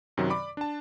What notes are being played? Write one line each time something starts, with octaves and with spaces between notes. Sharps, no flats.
F#2 C3 D#3 F#3
D5 B5 D6
D4 A5